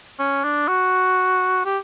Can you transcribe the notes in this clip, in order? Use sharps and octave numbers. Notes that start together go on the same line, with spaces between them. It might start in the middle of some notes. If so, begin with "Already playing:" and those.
C#4
D4
F#4
G4